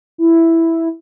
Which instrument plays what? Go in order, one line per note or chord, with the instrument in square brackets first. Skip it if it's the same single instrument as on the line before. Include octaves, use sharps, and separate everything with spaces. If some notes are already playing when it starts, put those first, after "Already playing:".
[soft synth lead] E4